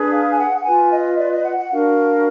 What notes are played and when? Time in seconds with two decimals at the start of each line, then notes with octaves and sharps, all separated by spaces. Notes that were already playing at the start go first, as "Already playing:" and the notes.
Already playing: D4 G#4 B4
0.11 F5
0.31 G#5
0.38 F#5
0.56 F#5
0.64 F4 B4 G#5
0.91 D#5
1.18 D5
1.31 D#5
1.44 F#5
1.57 F#5
1.70 D4 F#4 A#4 F5